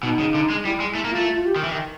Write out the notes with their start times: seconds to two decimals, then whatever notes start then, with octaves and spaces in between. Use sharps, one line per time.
0.03 B2 D#4
0.19 C#3
0.34 D3
0.50 G#3
0.65 G3 E4
0.80 G#3
0.95 A3 E4
1.05 A#3
1.10 F4
1.15 A3
1.25 F4
1.36 F4
1.46 G4
1.56 D#3
1.64 E3
1.71 D#3